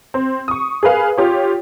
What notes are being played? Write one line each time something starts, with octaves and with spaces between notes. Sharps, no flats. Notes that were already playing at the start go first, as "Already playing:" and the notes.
C4
C#6 D#6
G#4 A#4 B4 F5 G#5
F4 G4 C#5